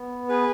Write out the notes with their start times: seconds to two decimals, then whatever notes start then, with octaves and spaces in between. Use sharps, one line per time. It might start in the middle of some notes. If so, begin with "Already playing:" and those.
Already playing: B3
0.29 G#4 B4